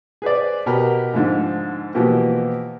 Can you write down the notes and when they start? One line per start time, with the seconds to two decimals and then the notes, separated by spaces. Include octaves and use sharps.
0.22 G#4 B4 C5 D5
0.66 B2 G4 A#4 B4 A#5 B5
1.13 G#2 D3 F3 D#4
1.95 B2 E3 F3 A#3 G4